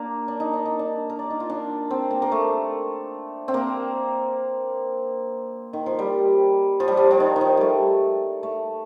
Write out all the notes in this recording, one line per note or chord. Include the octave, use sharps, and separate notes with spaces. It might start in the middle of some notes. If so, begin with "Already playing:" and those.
Already playing: A#3 D4
D4
D#4
D4
D#4
D4
A#4
D5
D#4
F4
D4
C4
A#3
A#3
A3
C4
A#3
D#3
F3
G3
F3
G3
F3
F3
D#3
D#3
F3
G3 A3
A3